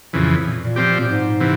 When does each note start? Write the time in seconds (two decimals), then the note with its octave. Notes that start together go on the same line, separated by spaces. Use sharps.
0.13 F2 A#2 C#3 E3
0.46 A#2
0.61 A#2
0.76 F3 C4 G4
0.98 A#2
1.08 G#2
1.40 C3 E3